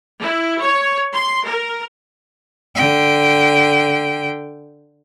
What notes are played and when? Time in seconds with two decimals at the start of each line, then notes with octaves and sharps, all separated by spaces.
0.21 E4
0.61 C#5
1.14 C6
1.46 A#4
2.76 D3 G5